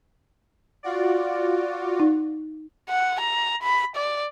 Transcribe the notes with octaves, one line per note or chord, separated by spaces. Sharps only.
F4 F#4 D5
D#4
F#5
A#5
B5
D5